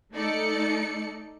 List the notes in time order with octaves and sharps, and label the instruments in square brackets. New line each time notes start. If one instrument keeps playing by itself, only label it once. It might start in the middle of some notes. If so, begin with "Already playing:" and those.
[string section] A3 D#4 A4 D5 C#7